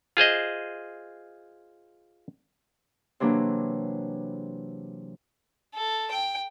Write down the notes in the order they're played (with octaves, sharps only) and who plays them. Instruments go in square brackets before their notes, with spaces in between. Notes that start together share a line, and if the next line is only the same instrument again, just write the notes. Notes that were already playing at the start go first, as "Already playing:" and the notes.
[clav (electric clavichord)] F4 G#4 C5 D#5
[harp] C3 E3 F#3 A#3 D4
[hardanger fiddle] A4
G5